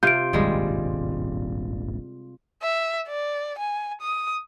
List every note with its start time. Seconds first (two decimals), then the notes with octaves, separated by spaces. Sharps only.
0.03 C3 F4 G6 D7
0.33 D#1 G#1 G2 G3 G#3
2.62 E5
3.08 D5
3.58 G#5
4.01 D#6